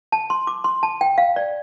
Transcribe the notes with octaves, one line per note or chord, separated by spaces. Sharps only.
A5
C6
D6
C6
A5
G5
F5
D5